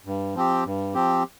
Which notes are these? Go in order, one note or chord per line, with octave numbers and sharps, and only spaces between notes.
G2
F3 C4 G4
G2
F3 C4 G4